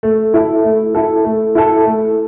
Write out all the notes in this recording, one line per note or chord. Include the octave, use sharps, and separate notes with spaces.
A3
E4 A4
A3
E4 A4
A3
E4 A4
A3